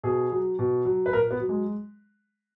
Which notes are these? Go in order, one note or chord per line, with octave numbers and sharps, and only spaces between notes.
B2 G#4
F#3
B2
F#3
B4
A#2 A#4
B3
F#3
G#3